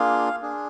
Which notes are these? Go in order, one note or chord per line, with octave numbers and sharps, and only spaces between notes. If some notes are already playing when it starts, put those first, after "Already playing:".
Already playing: A#3 D4 F4 G#4 F5
D4 G#4